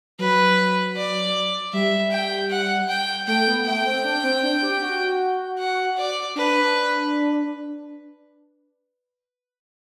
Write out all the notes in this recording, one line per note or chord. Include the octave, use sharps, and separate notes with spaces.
F#3 B4
D5
G3 E5
G5
F#5
G5
A3 G5
B3
A3 G5
C4
D4
C4
D4
G4
F#4
F#5
D5
D4 B4